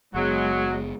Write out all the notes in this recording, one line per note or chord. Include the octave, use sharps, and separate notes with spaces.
F#1 F#3 G#3 B3